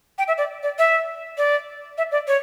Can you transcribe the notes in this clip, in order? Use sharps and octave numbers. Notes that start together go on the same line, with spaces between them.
G5
E5
D5
D5
E5
D5
E5
D5
C#5